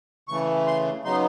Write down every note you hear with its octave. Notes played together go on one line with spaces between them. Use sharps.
C#3 E3 A3 C#6
C6
C#3 F#3 B3 D#4 C6